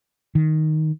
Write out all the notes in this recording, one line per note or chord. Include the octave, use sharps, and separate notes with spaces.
D#3